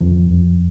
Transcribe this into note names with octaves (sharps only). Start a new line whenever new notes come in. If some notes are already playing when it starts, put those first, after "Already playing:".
F2 F3
F2